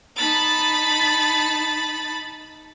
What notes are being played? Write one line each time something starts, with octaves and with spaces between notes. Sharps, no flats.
D#4 A5 B5 A6